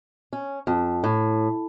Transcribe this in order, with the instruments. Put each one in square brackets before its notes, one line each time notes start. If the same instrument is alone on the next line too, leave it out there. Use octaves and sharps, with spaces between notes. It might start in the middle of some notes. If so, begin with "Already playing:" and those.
[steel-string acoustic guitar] C#4
F2
A2